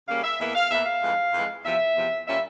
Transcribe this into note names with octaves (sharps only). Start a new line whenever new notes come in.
C#3 G3 A#3 C#4 F5
E5
E2 E3 A#3 E5
F5
E2 E3 A#3 E5
F5
F2 E3 G#3
F2 E3 G#3
E2 C3 F3 E5
E2 C3 F3
A#2 G3 C#4 E5